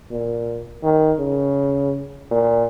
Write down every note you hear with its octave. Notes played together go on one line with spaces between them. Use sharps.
A#2
D#3
C#3
A#2